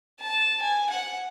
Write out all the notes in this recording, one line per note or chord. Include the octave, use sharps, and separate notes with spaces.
A5
G#5
F#5